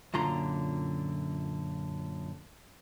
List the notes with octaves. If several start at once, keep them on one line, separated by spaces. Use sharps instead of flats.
F#2 A#2 D3 F4 A#5 C6